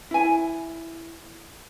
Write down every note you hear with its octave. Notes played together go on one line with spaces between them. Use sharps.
E4 G#5